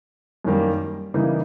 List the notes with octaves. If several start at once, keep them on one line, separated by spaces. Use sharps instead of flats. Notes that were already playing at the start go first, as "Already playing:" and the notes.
F#2 D#3 G3 A#3
C#3 E3 G3 A#3 D#4